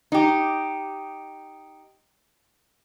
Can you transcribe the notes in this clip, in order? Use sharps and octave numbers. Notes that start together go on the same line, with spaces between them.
D#4 G4